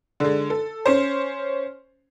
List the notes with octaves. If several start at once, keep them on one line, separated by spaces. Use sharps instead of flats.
D3 G#3
A4
C#4 C5